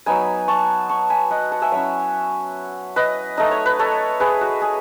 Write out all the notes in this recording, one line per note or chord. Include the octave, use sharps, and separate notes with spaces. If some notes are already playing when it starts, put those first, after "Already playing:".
F#3 B3 D#4 G#5 B5
A5 C#6
A5 C#6
G#5 B5
D#5 F#5
F#5 A5
E5 G#5
F#3 C#4 E4 C#5 E5
B4 D#5
A3 D#4 D#5
C#5
B4
A4 C#5
G#4 B4
F#4
G#4